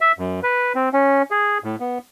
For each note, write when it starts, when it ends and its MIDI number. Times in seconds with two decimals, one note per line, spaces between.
0.01 0.12 76
0.19 0.40 42
0.43 0.73 71
0.75 0.89 60
0.93 1.22 61
1.31 1.58 68
1.64 1.76 45
1.80 1.98 59